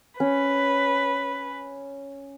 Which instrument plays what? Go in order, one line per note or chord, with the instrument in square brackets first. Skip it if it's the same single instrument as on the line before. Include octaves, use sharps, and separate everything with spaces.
[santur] C#4 [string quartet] B4